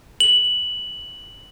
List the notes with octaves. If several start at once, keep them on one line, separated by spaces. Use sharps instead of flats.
F#7